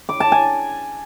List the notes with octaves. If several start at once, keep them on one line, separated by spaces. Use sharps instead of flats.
D6
A5
G#5